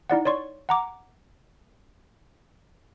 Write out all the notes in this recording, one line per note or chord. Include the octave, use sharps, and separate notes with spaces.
D#4 E4 D5 F#5
C#5 D5 C6 C#6
F#5 A#5 D6